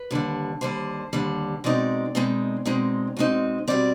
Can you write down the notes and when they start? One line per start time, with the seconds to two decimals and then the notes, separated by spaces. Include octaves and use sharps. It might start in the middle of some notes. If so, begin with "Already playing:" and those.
Already playing: B4
0.11 D#2 D3 G3
0.61 D#2 D3 G3 C5
1.13 D#2 D3 G3
1.64 B2 G#3 C4 D#4 D5
2.15 B2 G#3 C4 D#4
2.65 B2 G#3 C4 D#4
3.17 B2 G#3 C4 D#4
3.68 B2 G3 C4 D5